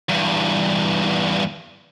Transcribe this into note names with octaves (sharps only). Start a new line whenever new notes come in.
E2 G2